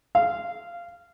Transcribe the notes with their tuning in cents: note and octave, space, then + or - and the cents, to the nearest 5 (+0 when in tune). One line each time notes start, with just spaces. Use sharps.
F5 -15